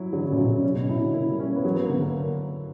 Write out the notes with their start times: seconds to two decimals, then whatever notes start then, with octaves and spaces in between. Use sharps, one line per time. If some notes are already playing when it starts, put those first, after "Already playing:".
Already playing: F#3 E4
0.12 D3 F#3
0.25 C#3
0.32 A#2
0.38 B2 F#3
0.51 C#3
0.63 C#3 C#4
0.76 B2
0.89 B2 E4
1.01 D3
1.14 A#3 E4
1.30 G3
1.39 C#4
1.48 A#3
1.56 B3
1.65 F#3 A#3
1.75 B3
1.84 A#3
1.89 D3 B3
2.02 A#3